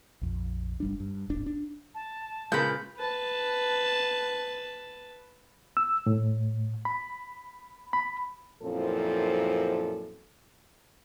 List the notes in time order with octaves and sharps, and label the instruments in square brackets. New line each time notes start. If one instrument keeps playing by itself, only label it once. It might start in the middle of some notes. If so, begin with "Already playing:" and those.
[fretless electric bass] A#1 F2
G1 G3 D4
G2
D1 G#1 D4
D4
[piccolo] A5
[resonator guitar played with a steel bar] A#2 C#3 [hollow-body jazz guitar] G#3 A#3 B4 [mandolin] B5 G6
[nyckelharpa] B4 A5
[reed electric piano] E6
A2
B5
B5
[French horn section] F#2 A#2 F3 C4 E4 A4